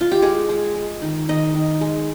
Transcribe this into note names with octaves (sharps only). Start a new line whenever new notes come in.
F4
G4
G#3 G#4
G#3
G#3
D#3
D#3 D#5
D#3
G#3